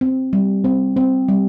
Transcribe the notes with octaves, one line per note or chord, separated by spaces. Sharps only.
C4
G3
C4
C4
G3